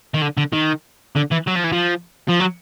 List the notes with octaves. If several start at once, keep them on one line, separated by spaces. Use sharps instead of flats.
D#3
D3
D3
D#3
D3
E3
F#3
F3
E3
F3
F3
F#3